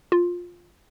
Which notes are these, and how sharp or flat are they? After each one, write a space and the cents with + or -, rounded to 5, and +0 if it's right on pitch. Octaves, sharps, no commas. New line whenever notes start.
F4 +10